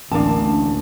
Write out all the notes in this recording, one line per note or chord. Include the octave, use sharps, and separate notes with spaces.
A1 D2 A#3 D4 A5